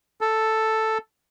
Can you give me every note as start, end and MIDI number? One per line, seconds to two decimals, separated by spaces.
0.21 0.98 69